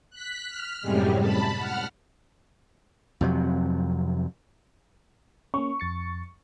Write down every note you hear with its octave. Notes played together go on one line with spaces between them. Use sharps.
F#6 B6
F6
F#2 A2 C3 G3 G#3
A5 B5
F#5 F6
F2 C3 F#3
A#3 C#4 C#6
F2 A6 C#7